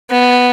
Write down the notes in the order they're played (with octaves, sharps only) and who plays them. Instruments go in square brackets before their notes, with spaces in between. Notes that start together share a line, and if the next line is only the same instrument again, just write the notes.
[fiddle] B3